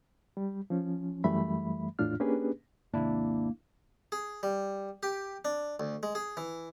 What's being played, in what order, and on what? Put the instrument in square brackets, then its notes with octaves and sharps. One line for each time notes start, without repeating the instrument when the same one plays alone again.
[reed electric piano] G3
F3 C#4
F#2 E3 G3 A3 E5 B5
E2 A2 D4 F4 F6
A#3 C#4 D4 G4 G#4 B4
[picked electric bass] G#1 D#2 C3 [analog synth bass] A#3 [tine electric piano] D4 E4
[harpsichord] G#4
G3
G4
D4
D2
G#3
G#4
E3